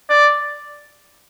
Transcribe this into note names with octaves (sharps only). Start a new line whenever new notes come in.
D5